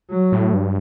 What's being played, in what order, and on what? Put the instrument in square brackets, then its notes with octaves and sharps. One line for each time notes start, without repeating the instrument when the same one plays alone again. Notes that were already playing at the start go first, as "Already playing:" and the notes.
[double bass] F#3
[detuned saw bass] A2
G2